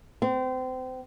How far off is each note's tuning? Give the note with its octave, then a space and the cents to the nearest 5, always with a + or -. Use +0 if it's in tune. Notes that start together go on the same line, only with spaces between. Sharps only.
C4 -30